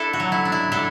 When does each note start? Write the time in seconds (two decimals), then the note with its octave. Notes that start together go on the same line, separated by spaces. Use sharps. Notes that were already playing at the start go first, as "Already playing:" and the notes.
Already playing: D4 E4 A4
0.13 F#4
0.20 F#3
0.32 E4
0.45 D4
0.52 E4
0.72 D4 E4 A4